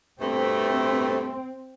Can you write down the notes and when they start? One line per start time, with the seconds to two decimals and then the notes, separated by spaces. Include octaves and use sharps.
0.20 G2 B2 A3 C4